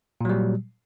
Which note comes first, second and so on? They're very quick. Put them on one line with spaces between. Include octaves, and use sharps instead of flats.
A#2 F#3 G3